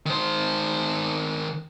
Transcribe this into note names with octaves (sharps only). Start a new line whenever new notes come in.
D#3 C5